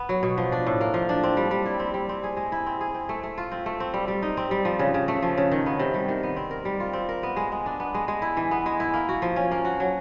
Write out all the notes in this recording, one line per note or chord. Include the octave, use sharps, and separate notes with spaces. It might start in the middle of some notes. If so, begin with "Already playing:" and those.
Already playing: B3
F#3
B2
F3
D4
A2
A#3
F3
D4
C4
G3
G3
E4
C4
G3
C4
G#4
G#3
E4
C4
G#4
C4
A3
A3
F4
C4
A3
C4
G3
G3
D#4
C4
G3
F3
C#3
C#3
A3
F3
C#3
D#3
B3
C3
G3
D#3
B3
C4
A#4
G3
F4
C4
A#4
B3
G#3
G#3
D4
B3
G#3
G#3
E4
E3
B3
G#3
E4
A#3
F#4
F3
C#4
A#3
F#4
F#3